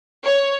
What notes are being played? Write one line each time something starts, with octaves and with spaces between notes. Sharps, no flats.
C#5